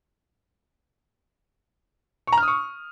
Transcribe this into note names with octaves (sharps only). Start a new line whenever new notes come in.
C#6
A#5
F6
D#6
C#6